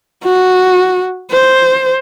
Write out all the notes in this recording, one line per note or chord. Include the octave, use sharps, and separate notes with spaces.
F#4
C5